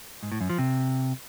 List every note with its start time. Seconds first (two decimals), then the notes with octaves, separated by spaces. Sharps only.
0.23 G#2
0.32 A2
0.41 F#2
0.50 F3
0.59 C3